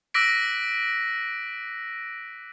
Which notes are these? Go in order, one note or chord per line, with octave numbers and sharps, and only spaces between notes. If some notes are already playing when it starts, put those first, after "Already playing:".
D6 E6 F#6 A#6 B6 D7